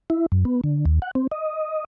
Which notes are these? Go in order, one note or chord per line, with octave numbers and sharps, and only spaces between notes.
E4
F#2
B3
D3
D#2
F#5
C4
D#5